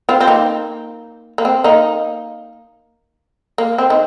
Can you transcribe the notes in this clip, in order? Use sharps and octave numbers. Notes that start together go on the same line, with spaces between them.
C4 F4
C4
A#3 D#4
A#3
C4
A#3 D#4
A#3
C4
D#3